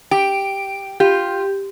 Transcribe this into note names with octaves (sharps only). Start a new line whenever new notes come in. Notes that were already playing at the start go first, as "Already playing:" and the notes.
G4 D7
F4 G4